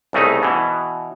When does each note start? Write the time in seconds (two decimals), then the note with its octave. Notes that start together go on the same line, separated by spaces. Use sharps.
0.13 C2 C#3 A3 D#4
0.43 B2 E3